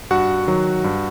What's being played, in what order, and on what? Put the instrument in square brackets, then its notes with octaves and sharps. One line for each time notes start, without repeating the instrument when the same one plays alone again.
[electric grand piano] G2 F#4 F#5
D#3 F#3
G2